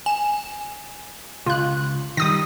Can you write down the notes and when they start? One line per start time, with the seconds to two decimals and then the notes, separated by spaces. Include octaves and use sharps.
0.06 G#5 E7
1.46 C#2 F4 F#6
2.17 D#3 G3 D#6 A#6